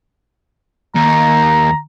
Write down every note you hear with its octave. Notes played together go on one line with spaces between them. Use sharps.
D#2 A#5